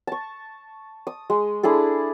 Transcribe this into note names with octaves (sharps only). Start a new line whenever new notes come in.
A5 C#6
D#6
G#3
D4 E4 G#4 A4